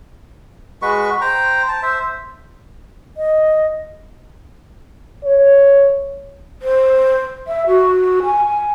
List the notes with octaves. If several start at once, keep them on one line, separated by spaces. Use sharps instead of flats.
G#3 F#4 B4 C#6
C5 G5 A#5
A5
C5 E5
D#5
C#5
C5
E5
F#4
G#5